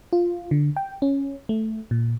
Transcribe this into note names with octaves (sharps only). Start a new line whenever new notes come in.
F4
D3
G5
C#4
A3
A#2